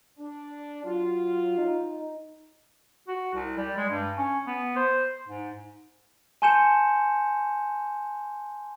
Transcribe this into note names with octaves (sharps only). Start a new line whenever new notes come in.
D4
F#3 F4
D#4
F#4
C2
G3
G#3
G2
C#4
B3
C5
G#2
G#5 A5 C6 G6 C#7 E7